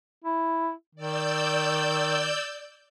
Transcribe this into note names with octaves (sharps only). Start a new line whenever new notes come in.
E4
D#3 D5 E6 G6